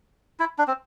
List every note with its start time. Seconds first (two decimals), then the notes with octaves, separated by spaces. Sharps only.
0.40 E4
0.58 D4
0.68 C4